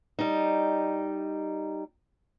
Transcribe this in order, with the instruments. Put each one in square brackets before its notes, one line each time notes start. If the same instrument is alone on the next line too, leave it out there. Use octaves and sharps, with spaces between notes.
[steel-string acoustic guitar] G3 D#4